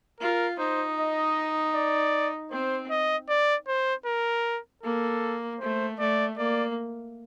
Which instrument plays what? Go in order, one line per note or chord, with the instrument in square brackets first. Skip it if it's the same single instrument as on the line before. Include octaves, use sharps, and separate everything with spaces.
[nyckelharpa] F4 [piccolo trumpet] A#4
[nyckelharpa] D#4 [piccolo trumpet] C5
[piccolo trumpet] D#5
D5
[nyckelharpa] C4 [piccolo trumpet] C5
[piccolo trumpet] D#5
D5
C5
A#4
[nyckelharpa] A#3 [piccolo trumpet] A4
[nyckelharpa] A3 [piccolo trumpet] C5
[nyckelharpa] A3 [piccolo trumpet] D5
[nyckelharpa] A#3 [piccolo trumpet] D5